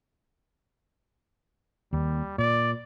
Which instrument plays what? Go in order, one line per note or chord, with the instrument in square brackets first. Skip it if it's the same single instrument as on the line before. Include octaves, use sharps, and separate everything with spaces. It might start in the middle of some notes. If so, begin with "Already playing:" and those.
[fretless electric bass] D#2 [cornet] G3
[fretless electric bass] A#2 [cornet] D5